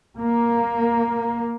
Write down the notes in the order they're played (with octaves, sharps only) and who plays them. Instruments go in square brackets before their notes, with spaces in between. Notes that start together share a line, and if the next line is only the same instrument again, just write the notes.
[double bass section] A#3